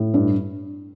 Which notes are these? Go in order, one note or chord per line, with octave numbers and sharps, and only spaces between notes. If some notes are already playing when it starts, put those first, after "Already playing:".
Already playing: A2
G2